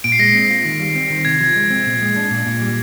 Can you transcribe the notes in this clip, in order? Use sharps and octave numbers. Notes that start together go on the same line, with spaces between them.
A#2 D7
C7
G#3 A#6
C7
C4
F4
D#3
G3
C4
D#3
C3 G#6
F3
G#3
C4
A#2
G#3
D4
A#2
A#2
G3